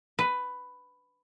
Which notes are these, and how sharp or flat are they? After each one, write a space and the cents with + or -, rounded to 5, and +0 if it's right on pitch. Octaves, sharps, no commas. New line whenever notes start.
B4 +10